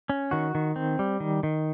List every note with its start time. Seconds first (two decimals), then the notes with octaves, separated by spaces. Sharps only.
0.09 C#4
0.31 D#3 F#4
0.55 D#3
0.76 C4
0.99 G3
1.20 D#3
1.43 D#3